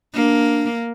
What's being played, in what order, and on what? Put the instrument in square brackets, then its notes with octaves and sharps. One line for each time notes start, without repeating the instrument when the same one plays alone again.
[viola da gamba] A#3 [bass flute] D4